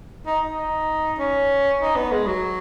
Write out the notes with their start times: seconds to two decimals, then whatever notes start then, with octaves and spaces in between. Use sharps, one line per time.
0.27 D#4
0.52 D#4
1.19 C#4
1.81 D#4
1.96 B3
2.12 G#3
2.27 F#3